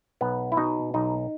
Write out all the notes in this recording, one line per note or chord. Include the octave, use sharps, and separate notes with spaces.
B1 B3
E4
B2 D#4
B1 D#4